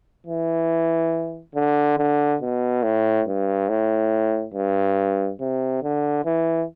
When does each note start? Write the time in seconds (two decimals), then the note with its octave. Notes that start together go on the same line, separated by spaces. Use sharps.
0.27 E3
1.55 D3
1.98 D3
2.42 B2
2.83 A2
3.27 G2
3.69 A2
4.54 G2
5.40 C3
5.83 D3
6.25 E3